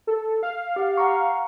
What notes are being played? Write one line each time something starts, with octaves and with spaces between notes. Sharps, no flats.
A4
F5
G4 F#5
F#5 A#5 C#6